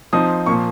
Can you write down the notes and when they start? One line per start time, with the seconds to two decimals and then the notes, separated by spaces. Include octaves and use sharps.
0.13 F3 C4 D#4 D#6
0.46 A#2 F3 A#3 C#6